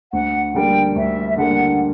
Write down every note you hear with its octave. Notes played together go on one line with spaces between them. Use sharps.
D2 F#5
D3 G3 A#3 G5
D2 E5
E5
D3 G3 A#3 F#5